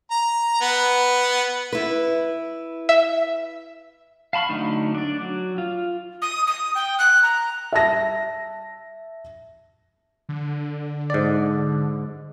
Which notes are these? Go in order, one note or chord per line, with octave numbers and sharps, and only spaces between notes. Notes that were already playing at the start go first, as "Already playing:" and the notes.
A#5
B3
E4 B4
E5
F5 A5 B5 C#6 F6
D3 F#3 A3 D#4
D4 D5
F#3
F4
D#6
D#6
G5
F#6
A#5
E5 A5 A#6
D3
G#2 D5